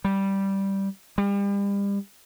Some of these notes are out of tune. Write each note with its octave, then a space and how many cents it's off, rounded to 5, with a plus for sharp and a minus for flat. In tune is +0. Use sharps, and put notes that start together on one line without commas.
G3 -5
G3 +35